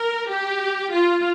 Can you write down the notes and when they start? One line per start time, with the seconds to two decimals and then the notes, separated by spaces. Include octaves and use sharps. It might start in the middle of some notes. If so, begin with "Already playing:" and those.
Already playing: A#4
0.30 G4
0.92 F4